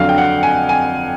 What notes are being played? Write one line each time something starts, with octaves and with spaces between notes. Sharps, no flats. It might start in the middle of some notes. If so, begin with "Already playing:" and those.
Already playing: F2 D3 F#3 F5
G5
F#5
G#5
G#5